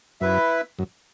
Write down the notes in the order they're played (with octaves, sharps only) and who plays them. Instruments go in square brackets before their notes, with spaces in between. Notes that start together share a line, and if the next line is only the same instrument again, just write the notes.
[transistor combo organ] F#2 [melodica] E4 B4 E5
[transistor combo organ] F#2